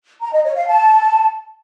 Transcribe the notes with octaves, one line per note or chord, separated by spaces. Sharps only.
A#5
D#5
C#5
F5
A5